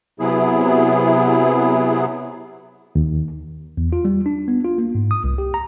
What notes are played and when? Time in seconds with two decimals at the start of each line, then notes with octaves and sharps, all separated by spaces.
0.20 C3 F#3 B3 E4 G#4
2.95 D#2
3.77 E2
3.93 F4
4.05 G3
4.26 D4
4.48 B3
4.65 F4
4.78 A#3
4.95 G#2
5.11 D#6
5.24 C2
5.38 G4
5.54 A#5